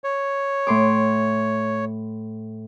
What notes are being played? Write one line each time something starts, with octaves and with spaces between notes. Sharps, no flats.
C#5
A2 C6 D6